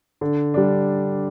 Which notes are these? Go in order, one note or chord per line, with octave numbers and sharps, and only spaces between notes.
D3
G3 D4